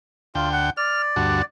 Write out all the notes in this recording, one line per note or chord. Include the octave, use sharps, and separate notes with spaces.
D2 F4 G5
F#5
D5 F6
D2 G2 F#4